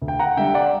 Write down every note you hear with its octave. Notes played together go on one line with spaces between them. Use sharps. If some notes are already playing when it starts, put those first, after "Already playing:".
D2
G5
F#5 A#5
D3 G3 E5 G5
D5 F#5